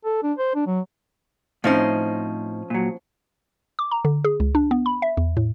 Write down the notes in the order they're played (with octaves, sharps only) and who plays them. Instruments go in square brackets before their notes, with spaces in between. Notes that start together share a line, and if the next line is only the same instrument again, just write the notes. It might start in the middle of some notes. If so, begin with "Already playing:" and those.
[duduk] A4
D4
C5
D4
F#3
[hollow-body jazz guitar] A2 C4 D#4 [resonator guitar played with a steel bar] F3 C#4 C5
[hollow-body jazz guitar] A#2 F#3
[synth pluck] D6
A#5
D3
G#4
C#2
D4
B3
B5
E5
E2
A2